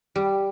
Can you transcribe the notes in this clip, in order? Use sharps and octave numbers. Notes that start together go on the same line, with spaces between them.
G3